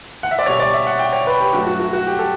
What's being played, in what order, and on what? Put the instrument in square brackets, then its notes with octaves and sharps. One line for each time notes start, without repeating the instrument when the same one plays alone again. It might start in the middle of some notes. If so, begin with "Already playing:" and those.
[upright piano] F#5
E5
D5
B2 G3 C#5
D5
E5
F#5
G5
C#5
B4
G4
G2 F#3 A3 F#4
F#4
F#4
F#4
G4
A4